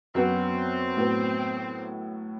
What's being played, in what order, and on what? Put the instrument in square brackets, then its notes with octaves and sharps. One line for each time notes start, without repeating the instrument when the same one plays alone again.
[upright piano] F#2 F#3 B3 F#4 [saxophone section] C4
[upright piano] A2 F#3 B3